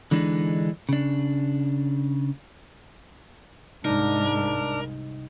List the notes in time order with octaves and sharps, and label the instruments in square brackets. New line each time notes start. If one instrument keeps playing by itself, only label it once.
[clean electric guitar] D3 E3 G#3 D4 D#4
C#3 D4
[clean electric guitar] C2 D#4 [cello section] G#2 [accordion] D4 [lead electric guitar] A#4